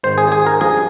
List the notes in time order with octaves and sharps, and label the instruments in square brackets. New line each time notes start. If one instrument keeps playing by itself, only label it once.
[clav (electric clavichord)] G#1 G#2 D#3 C5
G#4
G#4
A#4
G2 F3 G#3 G#4